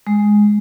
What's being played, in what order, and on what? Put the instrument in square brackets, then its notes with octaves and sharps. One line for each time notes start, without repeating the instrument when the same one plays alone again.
[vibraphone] G#3